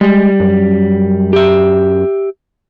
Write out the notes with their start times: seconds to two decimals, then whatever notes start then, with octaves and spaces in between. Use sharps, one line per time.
0.01 G3 G#3
0.40 F#2
1.33 G4 E5